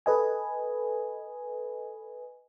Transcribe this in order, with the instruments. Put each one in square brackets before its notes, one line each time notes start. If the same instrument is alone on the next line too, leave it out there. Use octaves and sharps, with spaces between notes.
[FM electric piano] A4 B4 D#5 G#5